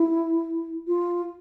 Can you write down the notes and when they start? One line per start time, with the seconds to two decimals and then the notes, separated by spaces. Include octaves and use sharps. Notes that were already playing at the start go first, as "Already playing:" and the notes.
Already playing: E4
0.87 F4